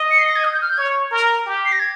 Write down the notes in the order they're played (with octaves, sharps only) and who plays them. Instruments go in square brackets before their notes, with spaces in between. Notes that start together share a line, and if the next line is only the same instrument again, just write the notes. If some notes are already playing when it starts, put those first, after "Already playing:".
Already playing: [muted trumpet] D#5
[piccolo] C#7
C7
A#6
G#6
D#6
G6
F6
G6
[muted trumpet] C#5 [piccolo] G#6
[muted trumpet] A#4
G4
[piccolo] C7
A#6
G#6